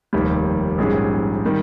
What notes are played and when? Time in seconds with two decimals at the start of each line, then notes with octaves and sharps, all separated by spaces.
0.13 F1 D#2 D#3 G3
0.78 A#1 G#2 G3 C#4 G#4
1.46 D#3 G3